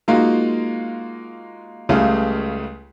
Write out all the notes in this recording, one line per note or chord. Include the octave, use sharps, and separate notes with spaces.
G#3 A#3 D#4 F4 F#4
C#2 C#3 G3 A3 F5